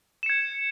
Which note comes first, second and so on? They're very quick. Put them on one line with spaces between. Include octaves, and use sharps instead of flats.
E7 C#7 G#6